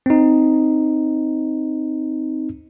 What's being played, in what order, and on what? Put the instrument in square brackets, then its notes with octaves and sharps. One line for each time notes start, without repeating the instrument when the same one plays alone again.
[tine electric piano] C4 D#4